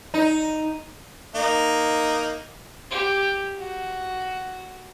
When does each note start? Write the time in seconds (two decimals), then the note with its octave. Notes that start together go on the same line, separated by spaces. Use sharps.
0.14 D#4
1.35 A#3 D#4
2.90 G4
3.58 F#4